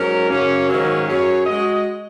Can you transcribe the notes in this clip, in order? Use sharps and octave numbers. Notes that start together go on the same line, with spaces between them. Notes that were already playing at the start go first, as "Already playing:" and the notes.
Already playing: G#2 F#3 C#4 A#4
F#2 C#3 A#3 C#4
G#2 D#3 F#3 A#3 C#4
F#2 F#3 C#4 G#4 C#5
G#3 F#4 D#5